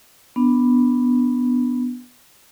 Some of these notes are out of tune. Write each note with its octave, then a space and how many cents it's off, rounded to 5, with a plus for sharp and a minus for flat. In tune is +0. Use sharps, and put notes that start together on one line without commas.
B3 +0 D4 +0